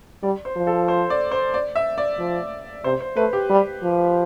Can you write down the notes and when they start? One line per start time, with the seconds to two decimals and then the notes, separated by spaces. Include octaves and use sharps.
0.23 G3 D5
0.45 C5
0.56 F3
0.67 A4
0.88 C5
1.10 D5
1.31 C5
1.54 D5
1.75 E5
1.98 D5
2.19 F3
2.84 C3 C5
3.01 C5
3.16 A3 B4
3.33 G4
3.50 G3
3.82 F3